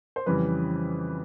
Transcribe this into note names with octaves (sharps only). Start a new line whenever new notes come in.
C5
F2 C#3 E3 G3 B4